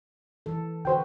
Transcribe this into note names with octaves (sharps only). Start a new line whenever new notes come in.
E3 A4
D3 F#4 B4 C5 G5